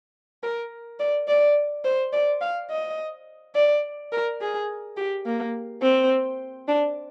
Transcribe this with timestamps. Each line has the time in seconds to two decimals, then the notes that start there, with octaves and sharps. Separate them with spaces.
0.43 A#4
1.00 D5
1.28 D5
1.85 C5
2.13 D5
2.41 F5
2.71 D#5
3.55 D5
4.12 A#4
4.41 G#4
4.97 G4
5.26 A#3
5.82 C4
6.68 D4